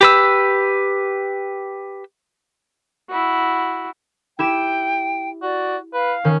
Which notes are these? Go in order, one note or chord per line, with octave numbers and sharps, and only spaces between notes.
G4 B4 E6
E4 F#4
E4 G4 G5 E7
F#4 D5
B4 F5
D#3 C#4